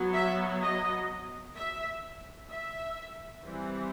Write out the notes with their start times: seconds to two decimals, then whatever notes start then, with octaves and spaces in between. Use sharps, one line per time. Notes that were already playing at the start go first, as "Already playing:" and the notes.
Already playing: F#3 B3
0.14 E5
0.61 D#5
1.55 E5
2.49 E5
3.42 E3 G3 C4